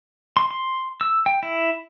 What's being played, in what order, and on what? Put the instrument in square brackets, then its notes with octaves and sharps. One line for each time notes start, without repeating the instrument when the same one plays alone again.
[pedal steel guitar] C6
C6
E6
G5
E4